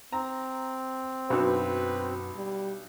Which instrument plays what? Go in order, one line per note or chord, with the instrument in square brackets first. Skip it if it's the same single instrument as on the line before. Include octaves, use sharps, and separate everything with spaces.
[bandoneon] C4 [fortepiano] A#5
[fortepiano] B1 D4 E6 [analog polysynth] F#2 F#4 [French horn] B4
[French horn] G3